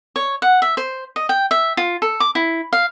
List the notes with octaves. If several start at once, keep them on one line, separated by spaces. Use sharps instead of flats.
C#5
F#5
E5
C5
D#5
G5
E5
F4
A4
D6
E4
F5